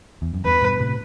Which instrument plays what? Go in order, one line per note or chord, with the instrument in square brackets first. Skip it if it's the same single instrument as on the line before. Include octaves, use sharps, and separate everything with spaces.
[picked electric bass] E2
F#2
[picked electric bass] E2 G2 [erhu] B4
[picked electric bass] G2 B2
A2 C3